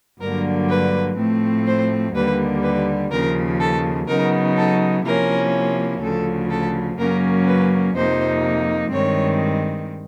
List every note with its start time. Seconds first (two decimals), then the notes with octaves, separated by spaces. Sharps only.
0.21 G2 D3 F#3 A#3 A#4
0.69 B4
1.17 A2 F3 A3 C4
1.66 C5
2.14 D#2 D3 G3 A#3 B4
2.63 B4
3.11 D#2 C#3 F3 A#4
3.59 A4
4.08 C#3 F#3 B3 D#4 A#4
4.56 A4
5.04 C3 F3 A#3 C#4 E4 A#4
6.02 D2 C#3 F3 A4
6.50 A4
6.98 F#2 C#3 F#3 A#3 C#4 A#4
7.47 B4
7.94 F2 C3 F3 A#3 D#4 C5
8.91 G2 D#3 G#3 C4 C#5